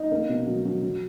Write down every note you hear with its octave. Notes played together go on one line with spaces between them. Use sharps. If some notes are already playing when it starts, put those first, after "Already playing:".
Already playing: D#4
A#3
B2
F#3
F#3
F#3